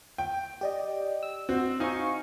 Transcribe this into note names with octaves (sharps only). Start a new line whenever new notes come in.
G5
G4 D5 D#5
E6
C4 F#4
D#4 F5 G#5 C#6